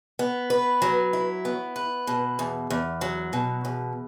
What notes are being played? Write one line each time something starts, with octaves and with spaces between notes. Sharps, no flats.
B3
B4
F#3
E4
B3
B4
B2
E2
E2
F#3
B2
E2